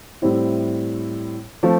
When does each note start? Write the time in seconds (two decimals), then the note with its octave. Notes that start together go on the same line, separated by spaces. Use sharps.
0.22 A2 G3 C4 E4
1.63 F3 A3 C4